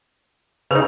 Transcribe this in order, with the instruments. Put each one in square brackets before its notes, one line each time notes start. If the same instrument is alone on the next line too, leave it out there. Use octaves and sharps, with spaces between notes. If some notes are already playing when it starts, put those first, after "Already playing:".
[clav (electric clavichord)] C#3 D#4 [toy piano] B4 C5